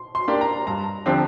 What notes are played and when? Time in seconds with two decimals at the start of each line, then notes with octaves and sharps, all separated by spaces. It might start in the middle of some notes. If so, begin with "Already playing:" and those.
Already playing: C6
0.15 C6
0.28 A#3 D4 G4
0.41 A#5
0.67 G2 A#5
1.06 D3 F3 C4 G4